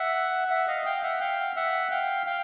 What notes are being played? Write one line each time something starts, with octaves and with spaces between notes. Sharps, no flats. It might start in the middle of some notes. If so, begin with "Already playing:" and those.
Already playing: E5 F#5
E5 F#5
D#5 F5
F5 G5
E5 F#5
F5 G5
E5 F#5
F5 G5
F5 G5